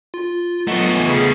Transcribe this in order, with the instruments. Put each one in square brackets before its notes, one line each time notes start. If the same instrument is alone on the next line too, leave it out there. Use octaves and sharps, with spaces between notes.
[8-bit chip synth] F4
[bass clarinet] F#3 [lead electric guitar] A3 B3 [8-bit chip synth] F4 D#5 F#5
[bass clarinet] E3
C#3